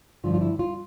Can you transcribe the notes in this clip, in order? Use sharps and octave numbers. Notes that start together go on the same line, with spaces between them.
G2 D3 F3 F4
F4
E4
F4